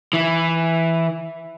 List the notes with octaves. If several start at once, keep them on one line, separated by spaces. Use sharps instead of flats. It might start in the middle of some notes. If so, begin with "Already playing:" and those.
E3